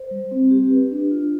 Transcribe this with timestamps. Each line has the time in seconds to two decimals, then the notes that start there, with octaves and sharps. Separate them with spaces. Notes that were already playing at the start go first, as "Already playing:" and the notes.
Already playing: C5
0.11 G3
0.31 C4
0.51 G4
0.70 B4
0.91 D4
1.11 F4